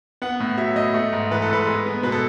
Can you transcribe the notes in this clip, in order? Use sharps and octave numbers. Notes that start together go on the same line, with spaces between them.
B3 F#5
A2
F#3 E5
A2 D#5
A3
G#2
E3 B4
A4
G#2 B4
G#3
B3
B2 B4
A4